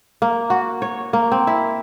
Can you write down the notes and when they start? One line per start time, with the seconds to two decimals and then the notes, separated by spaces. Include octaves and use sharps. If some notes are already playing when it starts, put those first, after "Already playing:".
0.22 A#3
0.50 F#4
0.82 C#5
1.13 A#3
1.32 C4
1.47 E4